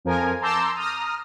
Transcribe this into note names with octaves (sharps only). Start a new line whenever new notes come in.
F2 F3 A#4 G#5
A5 A#5 C6 D6 E6 G6
A#5 D#6 F6